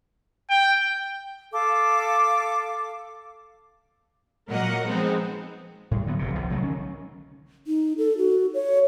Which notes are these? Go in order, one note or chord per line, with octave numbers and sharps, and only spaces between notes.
G5
A4 F5 D6
A#2 F#3 A#3 A#4 D#5 F#5
F3 F#3 G#3 B3 C4 D#4
A2 G3
D3 F#3 G#3 B3
F1 C3
B1 F3
C#3 F#3 A3
D#3 C#4
D#4
A4
F#4
C#5